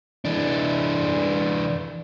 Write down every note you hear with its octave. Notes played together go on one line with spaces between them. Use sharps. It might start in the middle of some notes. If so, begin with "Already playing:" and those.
E3 D4